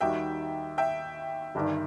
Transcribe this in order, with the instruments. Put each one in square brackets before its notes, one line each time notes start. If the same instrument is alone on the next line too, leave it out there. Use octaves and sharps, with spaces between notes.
[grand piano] D#2 D#3 G3 D#4 F#4 [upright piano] E5 G5
[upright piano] E5 G5
[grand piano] G1 G2 D#3